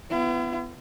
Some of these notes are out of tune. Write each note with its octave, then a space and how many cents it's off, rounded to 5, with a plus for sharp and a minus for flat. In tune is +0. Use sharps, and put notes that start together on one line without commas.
B3 +20 E4 +45